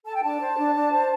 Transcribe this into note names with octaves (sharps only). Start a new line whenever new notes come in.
A4 A5
G5
D4 A5
C5
D4
D4
C5